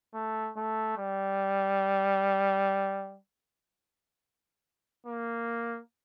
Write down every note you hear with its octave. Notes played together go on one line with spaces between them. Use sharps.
A3
A3
G3
A#3